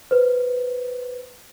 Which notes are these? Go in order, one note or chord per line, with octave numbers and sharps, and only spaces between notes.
B4 C5